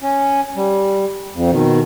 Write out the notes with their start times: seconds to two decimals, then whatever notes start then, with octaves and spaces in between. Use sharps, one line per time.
0.03 C#4
0.56 G3
1.35 F2
1.51 B2 D#3